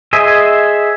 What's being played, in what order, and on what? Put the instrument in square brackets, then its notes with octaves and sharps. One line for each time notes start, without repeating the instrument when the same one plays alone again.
[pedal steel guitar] G#4 C5 D#5 E5